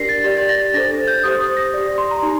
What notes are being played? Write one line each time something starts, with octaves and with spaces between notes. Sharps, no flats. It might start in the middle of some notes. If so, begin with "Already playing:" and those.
Already playing: D4 G4 A#4 D5 A#6 C7
A6
G4 D5
A6
A#6
A6
D4 A4 C5 A#6
A6
G6
G4 C5 D#6
D#6
A#6
G4 D5
A#6
C6
A#5
D#4 G4 C6